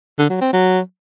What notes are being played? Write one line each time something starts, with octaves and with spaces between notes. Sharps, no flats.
D3
F#3
C4
F#3